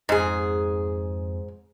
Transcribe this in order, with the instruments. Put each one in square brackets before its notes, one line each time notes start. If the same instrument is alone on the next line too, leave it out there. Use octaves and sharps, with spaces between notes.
[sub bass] F2 [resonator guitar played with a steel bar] G#2 G#4